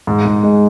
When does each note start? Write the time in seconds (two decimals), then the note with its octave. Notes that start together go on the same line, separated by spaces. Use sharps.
0.07 G#2
0.25 G#2
0.43 G#3